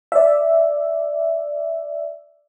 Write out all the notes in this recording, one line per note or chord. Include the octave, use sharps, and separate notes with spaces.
D5 E5